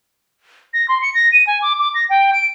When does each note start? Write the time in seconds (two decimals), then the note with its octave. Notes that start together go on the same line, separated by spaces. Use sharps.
0.73 A#6
0.88 C6
1.02 C#7
1.14 A#6
1.32 D#7
1.47 G#5
1.62 D6
1.79 D6
1.95 A#6
2.10 G5
2.33 D7